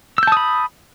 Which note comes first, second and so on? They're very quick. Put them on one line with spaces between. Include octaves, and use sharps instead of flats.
E6 G6 A5 D#6 B5